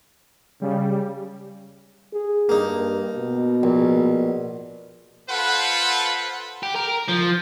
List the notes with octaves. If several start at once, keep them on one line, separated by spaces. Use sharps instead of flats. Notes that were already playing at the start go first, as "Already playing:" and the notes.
C#3 G3
G#4
G2 A#3 D#4
B2
A#1
F4 A4 B4 C5 F#5
G4
A#4
F3